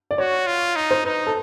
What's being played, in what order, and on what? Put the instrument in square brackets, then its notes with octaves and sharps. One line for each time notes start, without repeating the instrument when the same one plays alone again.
[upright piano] D5
[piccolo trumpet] F#4 [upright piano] C#5
[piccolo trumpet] F4
D#4
[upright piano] C5
[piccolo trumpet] D#4 [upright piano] B4
[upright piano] A4